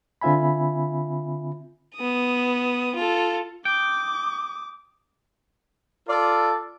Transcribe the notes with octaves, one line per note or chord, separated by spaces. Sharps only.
D3 C4 F4 E5 G#5 B5
B3 D#6
F4 A4
G5 D6 D#6
F4 A4 D5